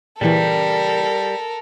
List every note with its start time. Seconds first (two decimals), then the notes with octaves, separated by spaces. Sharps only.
0.21 A#2 C#3 E3 G3 A4 A#4